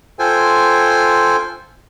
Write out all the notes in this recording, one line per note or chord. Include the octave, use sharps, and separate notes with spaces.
F4 A4 C5 G5 G#5